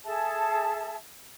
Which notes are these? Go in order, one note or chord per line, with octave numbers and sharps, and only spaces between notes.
G#4 A4 E5 A5